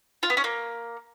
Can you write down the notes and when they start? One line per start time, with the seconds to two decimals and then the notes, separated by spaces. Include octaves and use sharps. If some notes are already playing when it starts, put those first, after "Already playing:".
0.23 F4
0.30 B3
0.37 C#4
0.44 A#3